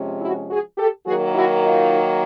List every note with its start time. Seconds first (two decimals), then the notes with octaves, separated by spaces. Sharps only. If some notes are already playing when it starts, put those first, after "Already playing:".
Already playing: C3 F3 G#3 C#4
0.21 E4 F#4
0.50 F#4 G#4
0.78 G4 A4
1.06 D#3 F#3 A#3 F#4 G#4
1.35 E4 F#4
1.63 D#4 F4